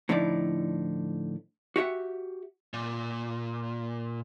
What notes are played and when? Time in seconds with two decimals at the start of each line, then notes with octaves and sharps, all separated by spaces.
0.09 A2 D3 F3 D#4 E4 D5
1.76 F#4 G4 E5 F#5
2.74 A#2